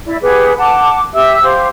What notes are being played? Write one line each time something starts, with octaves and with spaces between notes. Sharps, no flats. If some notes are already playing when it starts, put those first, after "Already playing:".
E4 D5 E5
G4 G#4 B4 F#5
F#5 A5 D6
G4 E5 E6
G4 C5 F5